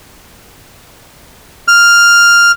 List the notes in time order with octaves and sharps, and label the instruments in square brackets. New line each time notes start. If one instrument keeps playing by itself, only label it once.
[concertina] F6